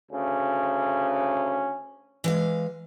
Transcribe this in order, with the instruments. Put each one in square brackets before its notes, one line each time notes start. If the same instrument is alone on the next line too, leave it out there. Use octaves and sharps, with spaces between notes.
[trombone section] D2 C#3 C#4
[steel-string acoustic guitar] E3 G#3 F5